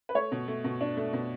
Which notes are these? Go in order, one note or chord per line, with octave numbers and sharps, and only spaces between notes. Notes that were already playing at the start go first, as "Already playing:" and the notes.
B4
A3 C#5
B2
A3
B2
D4
A3
B2